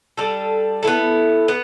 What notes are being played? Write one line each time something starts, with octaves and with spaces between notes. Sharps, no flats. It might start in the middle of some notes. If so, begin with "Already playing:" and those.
G3 D4 A4
B3 E4 A4
B3